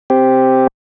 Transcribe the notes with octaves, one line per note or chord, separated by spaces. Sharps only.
C4 G4